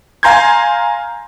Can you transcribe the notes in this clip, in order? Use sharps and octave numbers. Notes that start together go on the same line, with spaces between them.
F5 G#5 A#5 C6 G6 G#6